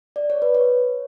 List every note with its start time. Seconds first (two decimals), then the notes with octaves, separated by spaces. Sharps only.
0.16 D5
0.30 C#5
0.42 B4
0.55 C#5